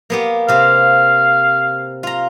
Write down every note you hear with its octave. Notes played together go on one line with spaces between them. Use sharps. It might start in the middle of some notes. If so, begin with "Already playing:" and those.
A#3 B3 G4
C3 G4 F5
F4 A#5